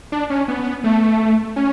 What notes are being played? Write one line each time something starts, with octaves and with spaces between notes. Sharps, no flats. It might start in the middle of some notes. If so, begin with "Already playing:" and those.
D4
C#4
B3
A3
C#4